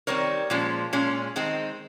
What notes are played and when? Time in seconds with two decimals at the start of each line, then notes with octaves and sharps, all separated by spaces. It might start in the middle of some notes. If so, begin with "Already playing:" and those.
0.07 D#3 G3 C4 A#4 C#5
0.50 A#2 F3 G#3 C#4
0.93 A#2 G#3 C#4
1.36 D#3 G#3 C4